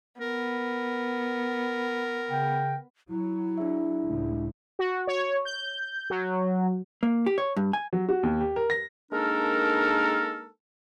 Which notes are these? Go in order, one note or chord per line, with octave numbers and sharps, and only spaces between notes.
B3 A#4
C#3 G5
F#3 E4
D4 G#4 E5
C#2 A2
F#4
C#5
G6
F#3
A#3
G4
C#5
G2
G#5
F#3
F#4
D#2
G4
A#4
A#6
G#3 A#3 D4 D#4 A4 A#4